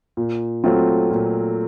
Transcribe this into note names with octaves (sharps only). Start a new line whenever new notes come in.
A#2
F#3 A3 C4 F4
A#2